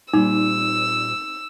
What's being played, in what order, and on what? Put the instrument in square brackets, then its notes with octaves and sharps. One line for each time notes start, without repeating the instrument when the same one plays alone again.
[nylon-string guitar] A#2 G3 C4 [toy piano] D#4 [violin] E6